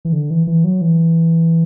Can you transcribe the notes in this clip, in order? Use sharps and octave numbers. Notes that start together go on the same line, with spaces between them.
E3
D3
E3
E3
F#3
E3